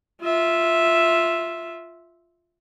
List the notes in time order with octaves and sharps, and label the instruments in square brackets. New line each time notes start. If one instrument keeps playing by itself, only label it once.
[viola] F4 E5